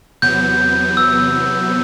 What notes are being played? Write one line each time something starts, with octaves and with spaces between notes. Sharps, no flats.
E2 C3 F#3 B3 G6
E6